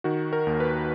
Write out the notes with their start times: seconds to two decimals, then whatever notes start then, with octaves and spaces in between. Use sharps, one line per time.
0.04 D#3 F#4
0.33 A#4
0.47 D#2
0.60 B4